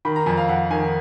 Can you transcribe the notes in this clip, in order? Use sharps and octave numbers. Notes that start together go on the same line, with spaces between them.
D#3 B5
A#5
F2 G#5
F5
F2 F#5
D#3 G#5